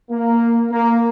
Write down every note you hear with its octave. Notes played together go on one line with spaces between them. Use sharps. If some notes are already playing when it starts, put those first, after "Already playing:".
A#3
A#3